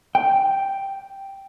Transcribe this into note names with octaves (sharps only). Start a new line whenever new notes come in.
G5